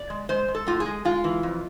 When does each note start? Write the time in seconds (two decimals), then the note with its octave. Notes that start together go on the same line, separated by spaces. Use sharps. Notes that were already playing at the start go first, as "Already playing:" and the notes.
Already playing: D5
0.10 G#3
0.29 G#3 C5
0.48 G#3
0.55 A4
0.67 A2 F4
0.80 G#4
0.86 G#3
1.05 G#3 F4
1.24 E3
1.43 F2